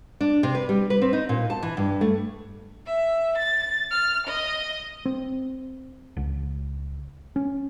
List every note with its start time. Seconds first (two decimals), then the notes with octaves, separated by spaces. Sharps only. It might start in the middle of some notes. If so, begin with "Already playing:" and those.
0.21 D4
0.43 C3
0.55 B4
0.69 G3
0.90 B4
1.02 C4
1.13 D#4
1.29 A#2
1.50 A5
1.63 E3
1.77 G2
2.01 A3
2.86 E5
3.37 A6
3.91 F6
4.27 D#5
5.05 C4
6.17 C#2
7.36 C#4